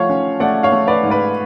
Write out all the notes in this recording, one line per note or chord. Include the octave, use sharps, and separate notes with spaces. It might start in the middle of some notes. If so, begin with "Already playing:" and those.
Already playing: F3 A3 C#5 F5 F#5
C#4
A3 D5 F#5
C#5 F5
A3
B4 D5
G#2
B4 D5